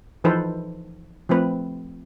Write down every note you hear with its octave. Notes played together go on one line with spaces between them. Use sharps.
E3 F3 D#4 A4 B4 C5
F3 A3 C4 B4